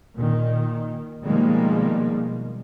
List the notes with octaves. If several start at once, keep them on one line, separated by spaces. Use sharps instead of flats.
A#2 D#3
B2 D#3 F3 G3 G#3 A#3